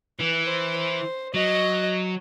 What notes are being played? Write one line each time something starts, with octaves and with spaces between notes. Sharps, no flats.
E3 B4
C5
C5
F#3 D#5